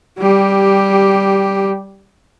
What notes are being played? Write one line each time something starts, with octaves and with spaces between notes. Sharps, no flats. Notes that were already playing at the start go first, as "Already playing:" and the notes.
G3 G4